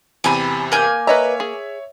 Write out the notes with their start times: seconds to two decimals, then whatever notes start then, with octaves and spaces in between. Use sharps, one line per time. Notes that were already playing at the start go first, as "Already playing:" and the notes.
0.24 E2 C3 G4 G#5 A5 B5
0.72 A#3 G#5 G6
1.07 B4 C#5 D#5 E5 A#5
1.40 G#4